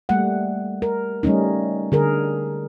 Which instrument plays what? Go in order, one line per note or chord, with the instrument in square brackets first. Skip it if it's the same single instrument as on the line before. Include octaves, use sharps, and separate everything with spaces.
[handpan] G3 A3 A#3 F#5
A#4
G3 A3 C#4 D#4
D3 G#4 A#4